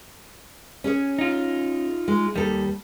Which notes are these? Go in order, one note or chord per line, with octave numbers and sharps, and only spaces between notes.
C#4 G#4 C#5
D#4 F4
G#3
D#2 G3 A4